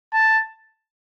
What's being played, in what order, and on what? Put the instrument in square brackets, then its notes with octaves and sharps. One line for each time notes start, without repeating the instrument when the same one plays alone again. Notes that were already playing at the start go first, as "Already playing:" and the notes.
[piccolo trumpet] A5